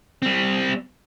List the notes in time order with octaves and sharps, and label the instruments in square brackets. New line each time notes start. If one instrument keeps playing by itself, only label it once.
[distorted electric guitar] G3 C4